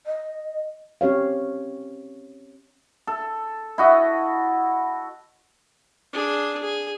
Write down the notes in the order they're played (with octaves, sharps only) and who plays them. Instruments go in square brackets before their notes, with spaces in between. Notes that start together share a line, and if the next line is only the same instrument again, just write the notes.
[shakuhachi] D#5
[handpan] C4 C#4 G4 C#5 F5
[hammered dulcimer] A4
E4 F#4 D#5
[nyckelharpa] D4 G#4
G#4